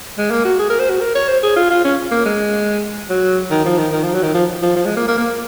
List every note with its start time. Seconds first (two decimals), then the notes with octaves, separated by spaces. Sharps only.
0.18 G#3
0.31 A#3
0.44 F#4
0.59 G#4
0.70 A#4
0.79 C5
0.90 F#4
1.00 A#4
1.15 C#5
1.28 C5
1.43 G#4
1.56 F4
1.70 F4
1.84 C#4
2.11 A#3
2.25 G#3
3.09 F#3
3.51 D#3
3.65 F3
3.78 D#3
3.93 D#3
4.03 F3
4.14 F#3
4.23 D#3
4.34 F3
4.62 F3
4.75 F3
4.86 G#3
4.96 A#3
5.07 A#3
5.17 A#3